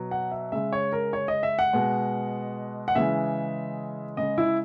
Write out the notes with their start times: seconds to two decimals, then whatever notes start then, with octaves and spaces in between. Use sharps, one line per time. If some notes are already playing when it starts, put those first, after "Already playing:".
Already playing: B2 F#3
0.11 F#5
0.31 E5
0.52 C#3 G#3 E5
0.73 C#5
0.93 A#4
1.13 C#5
1.28 D#5
1.43 E5
1.59 F#5
1.73 B2 G#3
2.88 F#5
2.95 C#3 E3 G#3 E5
4.17 C#3 G#3 D#5
4.38 E4